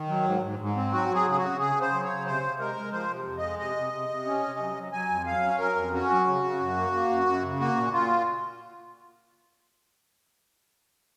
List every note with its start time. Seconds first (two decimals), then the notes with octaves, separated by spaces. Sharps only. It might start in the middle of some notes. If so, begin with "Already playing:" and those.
Already playing: D#3
0.08 F#3
0.25 G#2
0.42 G#2
0.59 G#2
0.76 C4
0.93 F#3 F#4
1.09 F#3
1.14 G#4
1.26 C#3 G#4
1.37 C#3 F#4
1.59 C#3 G#4
1.76 C#3
1.81 C5
1.92 F#3
2.03 C#5
2.09 C#3
2.25 C3 C5
2.43 C3
2.60 G#3 A#4
2.77 G#3
2.92 F3 C5
3.09 C3
3.26 F2
3.37 D#5
3.43 G#3
3.59 C3 D#5
3.76 C3
3.93 C3
4.09 C3
4.26 C#4
4.43 C3
4.59 F#3
4.76 F#3
4.92 F#3 G#5
5.09 F2
5.26 F#3 F5
5.43 C#4
5.59 F#3 A#4
5.76 F2
5.93 C#4 F#4
6.10 F#3
6.27 C#3
6.44 C#3
6.60 F#2
6.77 A#3
6.93 A#3
7.10 F#2
7.26 F#2
7.43 C#3
7.59 A#3 F#4
7.76 A#2
7.93 A#2 F4